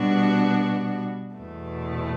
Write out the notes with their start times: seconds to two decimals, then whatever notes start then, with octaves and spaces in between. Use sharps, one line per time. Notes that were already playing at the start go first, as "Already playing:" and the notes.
Already playing: B2 G3 B3 D4 F#4
1.37 E2 B2 A3